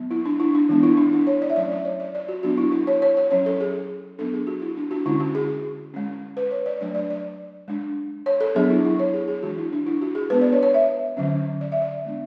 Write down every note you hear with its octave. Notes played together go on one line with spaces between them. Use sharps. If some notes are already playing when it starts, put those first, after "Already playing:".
Already playing: F#3 B3
E4
D4
E4
D4
E3 G#3 B3 D4
E4
D4
E4
C#5
D5
E5
F#3 A3 C#4 D5
D5
C#5
D5
D5
F#4
F#3 B3 D4 F#4
E4
E4
C#5
C#5
C#5
F#3 C#4 C#5
A4
G#4
F#3 B3 D4 A4
G#4
F#4
E4
D4
F#4
D3 G#3 C#4 E4
F#4
G#4
G#3 C#4
B4
C#5
D5
F#3 A3 D4 D5
D5
D5
G#3 D4
C#5
A4
F#3 B3 D4 G#4
E4
E4
C#5
G#4
G#4
E3 G#3 D4 F#4
E4
D4
E4
F#4
G#4
G#3 B3 D4 B4
D5
C#5
C#5
E5
D3 F#3 C#4
D5
E5
D5
G#3 B3 D4